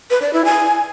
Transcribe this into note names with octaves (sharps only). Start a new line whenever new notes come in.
B4
D5
E4
G#5